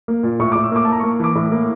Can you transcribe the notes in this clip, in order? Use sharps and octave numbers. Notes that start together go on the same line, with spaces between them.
A#3
A#2
A2 C#6
D6
A2
E6
A#3 D6
A5
A#3 A#5
C#6
A#3
E3 D6
A2
A#3